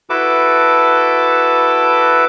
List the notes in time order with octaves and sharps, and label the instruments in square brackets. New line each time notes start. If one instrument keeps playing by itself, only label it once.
[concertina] E4 F#4 A4 B4 A5 D6